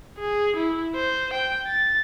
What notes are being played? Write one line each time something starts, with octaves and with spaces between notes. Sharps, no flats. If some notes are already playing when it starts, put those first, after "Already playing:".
G#4
E4
C5
G5
A6